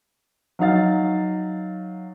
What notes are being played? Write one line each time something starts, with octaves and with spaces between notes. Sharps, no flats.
F#3 D#4 F5 A6